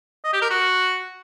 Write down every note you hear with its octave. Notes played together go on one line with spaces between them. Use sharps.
D#5
G4
A#4
F#4